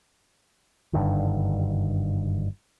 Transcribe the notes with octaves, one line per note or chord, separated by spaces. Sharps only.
F#1 G2 D3 D#3